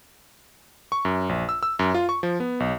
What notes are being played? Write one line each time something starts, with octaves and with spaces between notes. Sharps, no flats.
C#6
F#2
A#1
E6
E6
F#2
F4
C#6
F3
B3
B1